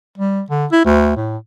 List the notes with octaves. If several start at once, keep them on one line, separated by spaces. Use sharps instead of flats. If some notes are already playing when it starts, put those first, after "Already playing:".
G3
D3
E4
D2
A2